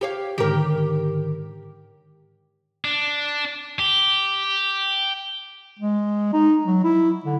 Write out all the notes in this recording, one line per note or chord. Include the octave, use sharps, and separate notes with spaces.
G4 C#5 F5
G#2 D3 D#3 G4 A#4
D4
G4
G#3
D#4
F#3
E4
D3